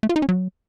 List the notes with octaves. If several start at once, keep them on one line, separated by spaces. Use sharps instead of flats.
A3
F4
D#4
C#4
F#3